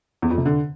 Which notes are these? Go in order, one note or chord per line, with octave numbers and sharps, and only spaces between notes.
E2
F2
C3
D3